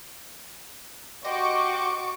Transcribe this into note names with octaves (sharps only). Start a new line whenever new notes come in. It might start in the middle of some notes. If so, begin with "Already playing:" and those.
F#4 G4 C5 D#5 C#6 D6